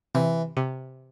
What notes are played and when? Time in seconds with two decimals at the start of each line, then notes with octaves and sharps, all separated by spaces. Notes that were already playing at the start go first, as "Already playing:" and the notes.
0.15 C3 E3
0.57 C3